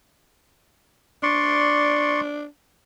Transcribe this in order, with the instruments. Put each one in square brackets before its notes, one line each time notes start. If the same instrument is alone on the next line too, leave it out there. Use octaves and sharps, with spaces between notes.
[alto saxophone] D4 [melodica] D5 C6 C#6